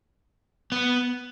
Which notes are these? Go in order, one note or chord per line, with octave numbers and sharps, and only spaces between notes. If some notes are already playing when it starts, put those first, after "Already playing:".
B3